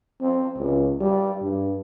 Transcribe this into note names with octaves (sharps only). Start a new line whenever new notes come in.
C4
C#2
G3
G2